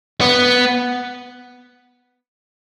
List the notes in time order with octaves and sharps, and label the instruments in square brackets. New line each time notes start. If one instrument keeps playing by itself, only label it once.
[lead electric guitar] B3